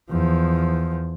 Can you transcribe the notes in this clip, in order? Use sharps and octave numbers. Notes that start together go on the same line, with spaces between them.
E2 F3